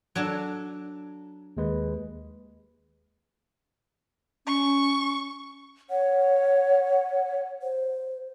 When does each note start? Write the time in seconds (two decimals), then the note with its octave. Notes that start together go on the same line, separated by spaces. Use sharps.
0.15 F#3 D4 A4
1.57 D#2 G#3 B4
4.47 C#4 C#6
5.90 C#5 F#5
7.62 C5